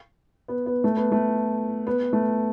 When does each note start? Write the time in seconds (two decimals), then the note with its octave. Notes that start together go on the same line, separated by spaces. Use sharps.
0.48 B3
0.66 B3
0.84 A3
0.97 B3
1.12 A3
1.87 B3
2.13 A3